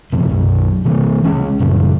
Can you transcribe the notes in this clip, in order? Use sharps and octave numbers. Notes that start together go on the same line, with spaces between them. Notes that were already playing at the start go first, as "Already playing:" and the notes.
F#1 F2 C3
B1 F#2
C3 E3 A#3
C#2 G#3 C#4
A#1 F#2 C#3 G3